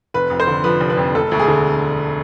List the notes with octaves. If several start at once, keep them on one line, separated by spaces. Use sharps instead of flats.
F1 B4
F2
C5
D3
F3 B4
F1
B4
F2
E1 A4
D2
G#4
D3